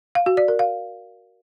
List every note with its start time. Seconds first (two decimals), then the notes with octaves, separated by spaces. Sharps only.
0.15 F5
0.26 F#4
0.37 D5
0.48 A#4
0.59 F5